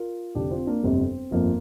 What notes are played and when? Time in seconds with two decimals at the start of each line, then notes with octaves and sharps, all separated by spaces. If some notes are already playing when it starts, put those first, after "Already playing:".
Already playing: F4 A#4
0.35 F1 F2 D3 D4 G4
0.51 C4 F4
0.67 A#3 D4
0.83 G1 F2 C3 G3 C4
1.31 G1 F2 F3 A#3